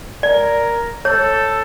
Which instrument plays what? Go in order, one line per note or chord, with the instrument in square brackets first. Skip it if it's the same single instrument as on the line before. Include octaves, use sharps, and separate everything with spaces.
[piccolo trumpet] A#4 [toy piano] D5
[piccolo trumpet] A4 [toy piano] C#5